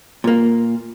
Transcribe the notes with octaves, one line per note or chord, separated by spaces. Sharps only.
A#2 A#3